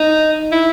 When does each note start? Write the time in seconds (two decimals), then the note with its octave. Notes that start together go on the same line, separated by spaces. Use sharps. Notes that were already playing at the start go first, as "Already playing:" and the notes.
Already playing: D#4
0.52 E4